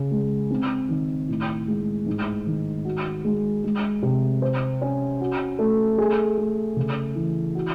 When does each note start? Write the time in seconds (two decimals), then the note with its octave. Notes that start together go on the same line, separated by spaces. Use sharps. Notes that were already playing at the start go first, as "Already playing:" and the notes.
Already playing: C#3
0.11 G#3
0.50 C4
0.89 D#3
1.29 A2
1.68 G#3
2.06 G#2
2.46 D#3
2.85 F#4
3.24 G#3
3.64 G#3
4.02 C3
4.42 C5
4.81 C#4
5.21 F#4
5.59 A3
5.98 G#4
6.38 A3
6.76 C#3
7.15 E3
7.55 F#4